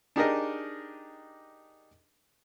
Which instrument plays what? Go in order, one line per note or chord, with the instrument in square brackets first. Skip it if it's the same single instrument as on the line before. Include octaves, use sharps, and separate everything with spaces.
[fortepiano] D4 D#4 G4 G#4 A#4 D#5